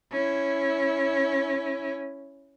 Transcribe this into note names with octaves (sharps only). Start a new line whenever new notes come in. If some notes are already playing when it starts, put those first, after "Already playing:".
C#4 E4